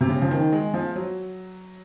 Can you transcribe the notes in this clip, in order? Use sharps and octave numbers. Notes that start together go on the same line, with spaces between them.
C3
C#3
F3
D#3
G#3
F3
F#3